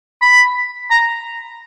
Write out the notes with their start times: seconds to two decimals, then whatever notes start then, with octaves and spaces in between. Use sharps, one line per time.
0.21 B5
0.90 A#5